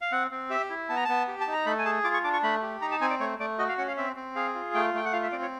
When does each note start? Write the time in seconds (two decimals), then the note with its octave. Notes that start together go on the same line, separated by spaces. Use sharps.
0.01 F5
0.12 C4 F#5
0.31 C4
0.50 G4 E5
0.70 E4
0.89 B3 A5
0.96 A#5
1.05 B3 A5
1.28 G4
1.41 A5
1.47 D#4
1.53 A#5
1.66 A3 B5
1.79 G#5
1.85 G#4 A5
2.04 F4 D6
2.14 C#6
2.24 D4 D6
2.33 C#6
2.43 A3 B5
2.62 G4
2.81 D#4 A#5
2.91 A5
3.01 C4 G#5
3.10 D5
3.20 A3 C#5
3.39 A3 D5
3.59 F#4 D#5
3.69 F5
3.78 C#4 F#5
3.88 F5
3.97 C4 E5
4.16 C4
4.36 G#4 F5
4.55 F4
4.74 A3 G5
4.94 A3 G5
5.05 F#5
5.13 F4 F5
5.23 E5
5.32 C4 D5
5.42 C#5